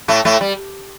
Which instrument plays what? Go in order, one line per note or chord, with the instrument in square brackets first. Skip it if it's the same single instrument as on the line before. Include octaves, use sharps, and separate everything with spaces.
[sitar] A2 A3
A2 A3
G3